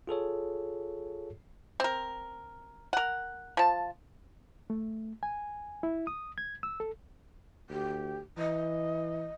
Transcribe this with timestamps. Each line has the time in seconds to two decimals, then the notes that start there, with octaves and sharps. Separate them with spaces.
0.07 F4 G#4 A4 C#5
1.80 C4 A#4
2.93 A#4 F#5
3.57 F3 A5
4.70 A3
5.23 G#5
5.83 E4
6.07 D#6
6.38 G#6
6.63 E6
6.80 A4
7.70 D2 G4
8.38 E3 D#5